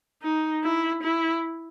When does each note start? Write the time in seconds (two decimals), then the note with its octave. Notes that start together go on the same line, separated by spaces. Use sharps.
0.22 D#4
0.63 E4
1.03 E4